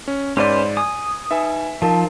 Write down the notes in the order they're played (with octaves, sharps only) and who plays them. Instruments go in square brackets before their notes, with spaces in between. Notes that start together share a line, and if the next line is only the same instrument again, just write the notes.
[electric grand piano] C#4
[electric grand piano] G#2 D5 [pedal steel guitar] C#4 B4 C5
[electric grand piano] G#5 [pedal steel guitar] D#6
[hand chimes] D#4 B4 G#5 [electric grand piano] E5
[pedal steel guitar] F3 [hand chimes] D#4 A#4 A5